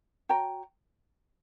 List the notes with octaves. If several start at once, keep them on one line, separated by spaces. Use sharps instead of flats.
F#4 C#5 G5 A#5